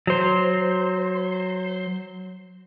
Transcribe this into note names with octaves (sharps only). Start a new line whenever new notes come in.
F#3 C5